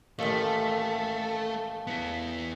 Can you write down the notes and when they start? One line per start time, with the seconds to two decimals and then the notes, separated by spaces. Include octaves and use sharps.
0.19 A1 D#2 A3 F5 A5
1.87 B3 E4